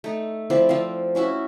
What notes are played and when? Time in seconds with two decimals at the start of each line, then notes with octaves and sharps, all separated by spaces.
0.04 A3 D#4
0.50 F3 C4 E4 D5
0.69 F3 C4
1.15 C#4 E4 F#4 E5